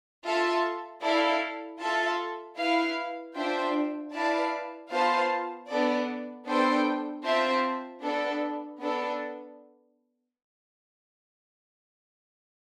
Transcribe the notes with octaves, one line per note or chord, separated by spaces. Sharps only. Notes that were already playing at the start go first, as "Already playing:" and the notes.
F4 A4 E5 A5
E4 A4 D5 F5
F4 A4 E5 A5
E4 B4 F5
D4 F4 C5 E5 G5
E4 B4 D5 F5 A5
B3 F4 C5 F5 A5
B3 D4 A4 D5
B3 D4 A4 C5 G5
C4 F4 C5 E5 A5
B3 D4 A4
B3 D4 A4